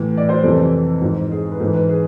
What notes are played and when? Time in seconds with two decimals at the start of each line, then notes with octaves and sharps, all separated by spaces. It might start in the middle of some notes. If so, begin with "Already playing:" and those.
Already playing: A2 E3
0.17 D5
0.29 C5
0.44 F2 C3 E3 A4
1.01 G#2 E3
1.31 G#4
1.52 B4
1.60 G#2 A4
1.64 E3
1.74 B4
1.89 G#4